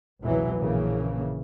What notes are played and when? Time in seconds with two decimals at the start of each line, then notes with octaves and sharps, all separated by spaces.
0.22 F1 C#2 B2 E3 F#3
0.59 A#1 C#3 E3 A#3